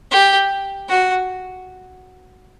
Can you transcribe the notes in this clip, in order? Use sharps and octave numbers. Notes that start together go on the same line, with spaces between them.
G4
F#4